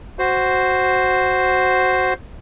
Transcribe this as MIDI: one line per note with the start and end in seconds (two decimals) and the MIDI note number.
0.19 2.14 66
0.19 2.14 72